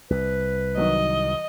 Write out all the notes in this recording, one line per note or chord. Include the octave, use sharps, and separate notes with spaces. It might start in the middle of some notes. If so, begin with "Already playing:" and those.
C2 B4
D#3 F#3 D#5